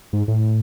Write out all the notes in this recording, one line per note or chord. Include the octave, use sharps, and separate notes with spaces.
G#2
A2